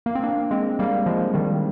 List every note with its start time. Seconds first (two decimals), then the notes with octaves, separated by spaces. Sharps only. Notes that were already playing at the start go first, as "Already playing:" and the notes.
0.06 A#3
0.15 C4
0.24 A#3 D4
0.51 G#3 C4
0.79 G3 A#3
1.06 F3 G#3
1.23 F3
1.34 D#3 G3